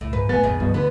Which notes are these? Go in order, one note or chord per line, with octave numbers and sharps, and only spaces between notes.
C#2 A2
G#2 B4
E2 A2 B3 G#5 A6
A#1 F2 A#2 D#3 G#3 B3
C#2 G2 B2 E3
D2 D3 B3 B4